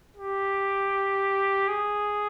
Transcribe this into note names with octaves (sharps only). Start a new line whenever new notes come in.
G4
G#4